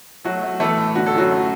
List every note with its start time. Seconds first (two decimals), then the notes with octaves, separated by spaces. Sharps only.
0.25 F#3 A3 F#4
0.43 A3
0.60 E3 A3 A4
0.77 A2
0.95 D3 F#4
1.06 A4
1.14 F#2 F#3 F#4
1.31 A3